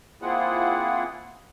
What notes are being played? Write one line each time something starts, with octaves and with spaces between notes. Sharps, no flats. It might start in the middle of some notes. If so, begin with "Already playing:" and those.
A#3 C4 E4 F4 G#4 F#5